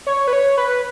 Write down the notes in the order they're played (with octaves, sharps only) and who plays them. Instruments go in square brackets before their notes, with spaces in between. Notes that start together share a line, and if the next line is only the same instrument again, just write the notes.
[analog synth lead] C#5
B4
C#5
B4